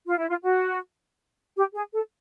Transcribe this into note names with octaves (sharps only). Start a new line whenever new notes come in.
F4
E4
F4
F#4
G4
G#4
A4